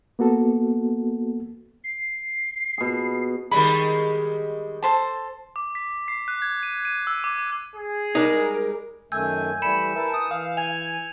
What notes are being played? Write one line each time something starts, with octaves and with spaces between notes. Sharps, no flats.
A#3 B3 F#4 A4
C7
B2 G#4
D#3 G3 G#3 B5
A4 C5 A5
D6
B6
C7
F#6
G#6
D#7
D#7
E6
D6
D6
G#4
G3 G#3 D#4 A#4
F#2 D#3 A3 G#5 E6 G6
E3 G3 A3 G#5 B5 C#7 E7
E4 A#4 B4 A5
D#6
E3 F5
G#5 G#6 F7